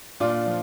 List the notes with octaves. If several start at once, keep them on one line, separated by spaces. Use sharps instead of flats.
A#2 D4 F4
F3